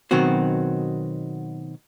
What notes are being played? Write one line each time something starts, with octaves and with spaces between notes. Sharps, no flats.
B2 D#3 F#3 B3 C4 F#4